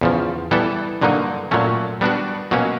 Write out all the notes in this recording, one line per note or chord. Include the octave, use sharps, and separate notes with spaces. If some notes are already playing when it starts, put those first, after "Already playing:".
E2 C#3 F3
E3 G3 B3 E4 A4
G2 D3 F#3 A#3 D#4
A#2 F#3 A3 C#4
G3 B3 D4 F#4
B2 F#3 A#3 C#4